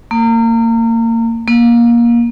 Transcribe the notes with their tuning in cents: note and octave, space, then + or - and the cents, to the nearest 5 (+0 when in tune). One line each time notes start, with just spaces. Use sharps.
A#3 -30
A#3 +20